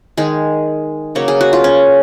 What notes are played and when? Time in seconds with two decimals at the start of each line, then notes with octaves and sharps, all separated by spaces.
0.18 D#3 G#3 G#4
1.15 C#3 F#3 A#3 C#5
1.28 G#4
1.41 F#4
1.53 F4
1.64 C#4